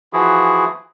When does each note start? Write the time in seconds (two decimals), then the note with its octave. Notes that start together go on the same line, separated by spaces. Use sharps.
0.13 E3 F3 E4 F#4 G#4